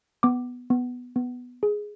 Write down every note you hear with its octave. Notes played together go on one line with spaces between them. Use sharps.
B3 D6
B3
B3
G#4